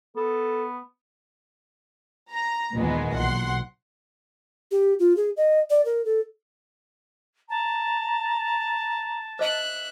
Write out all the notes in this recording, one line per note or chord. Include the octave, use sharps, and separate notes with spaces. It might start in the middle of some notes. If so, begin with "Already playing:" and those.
B3 A4
A#5
D#2 A#2 D#3 E3 G#3 B3
B1 F#5 C6
G4
F4
G#4
D#5
D5
A#4
A4
A5 A#5
C5 D#5 E5 F#6